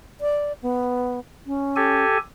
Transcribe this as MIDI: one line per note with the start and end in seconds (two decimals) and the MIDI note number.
0.21 0.53 74
0.63 1.20 59
1.46 2.05 61
1.76 2.17 67
1.76 2.17 69
1.76 2.17 80